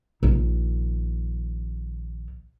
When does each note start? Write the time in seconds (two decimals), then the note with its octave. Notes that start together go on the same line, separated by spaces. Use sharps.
0.23 A#1 D#3